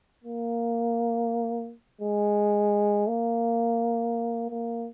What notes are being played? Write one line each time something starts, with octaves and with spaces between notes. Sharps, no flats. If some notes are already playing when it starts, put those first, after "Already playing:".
A#3
G#3
A#3
A#3